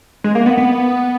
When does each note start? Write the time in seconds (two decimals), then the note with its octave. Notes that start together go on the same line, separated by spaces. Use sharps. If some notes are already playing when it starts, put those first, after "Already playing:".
0.24 G#3
0.35 A#3
0.46 B3
0.57 B3